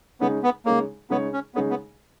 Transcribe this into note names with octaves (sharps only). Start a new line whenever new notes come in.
C#3 G#3 B3 D#4 G#4 C#5
B3
C#3 G#3 A#3 D#4 G#4 C#5
C#3 G#3 B3 D#4 G#4 C#5
C#4
C#3 G#3 B3 D#4 G#4 C#5
B3